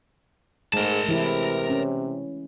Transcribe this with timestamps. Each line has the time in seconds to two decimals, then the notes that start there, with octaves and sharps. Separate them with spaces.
0.73 G#2 G#3 A3 A#4 A5
1.09 C3 E3 E4
1.70 C#4